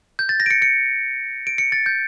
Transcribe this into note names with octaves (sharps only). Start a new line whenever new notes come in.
G6
A6
A#6
D7
C#7
C#7
D7
C#7
A6
G6